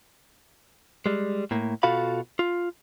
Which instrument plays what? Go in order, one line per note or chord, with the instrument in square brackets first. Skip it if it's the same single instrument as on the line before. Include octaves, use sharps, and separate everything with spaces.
[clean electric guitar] G3 G#3
A2 A#3
B2 F4 F#4 A4 F5 B5
F4